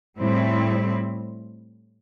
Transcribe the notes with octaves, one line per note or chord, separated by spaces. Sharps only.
A2 G3 C4 E4